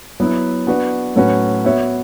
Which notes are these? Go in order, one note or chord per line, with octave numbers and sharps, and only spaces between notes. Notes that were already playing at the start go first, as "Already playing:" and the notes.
F#3 B3 E4
B3 D4 F#4 B4
A2 F#3 C#4 F#4 B4
B3 F#4 C#5 E5